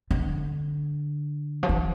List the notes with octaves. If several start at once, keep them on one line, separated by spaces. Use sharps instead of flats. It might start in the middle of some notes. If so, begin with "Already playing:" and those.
D3
F3
E3